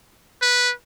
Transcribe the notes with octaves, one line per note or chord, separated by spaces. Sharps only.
B4